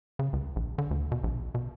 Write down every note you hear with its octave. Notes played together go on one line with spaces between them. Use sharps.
C#3
C#2
A#1
D3
D2
B2
A#1
B2